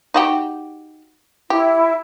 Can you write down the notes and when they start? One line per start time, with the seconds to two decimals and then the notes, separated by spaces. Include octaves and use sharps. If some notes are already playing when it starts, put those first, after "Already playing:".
0.14 D#4 F#4 G4
1.50 E4 G4